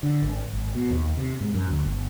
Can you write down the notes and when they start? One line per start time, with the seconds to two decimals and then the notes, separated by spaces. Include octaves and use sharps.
0.03 D3
0.22 G#1
0.53 G#1
0.75 B2
0.90 D#2
1.17 C3
1.41 G#2
1.54 F#2
1.71 D2
1.84 G1